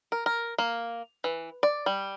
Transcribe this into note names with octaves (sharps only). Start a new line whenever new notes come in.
A#4
A#4
A#3
E3
D5
G3